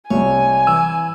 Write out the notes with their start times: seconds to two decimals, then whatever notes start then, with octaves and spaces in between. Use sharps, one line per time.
0.10 C2 C#5 G#5
0.67 E3 E6